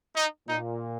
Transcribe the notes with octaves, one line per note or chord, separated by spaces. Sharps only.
D#4
A#2 A#3 D#4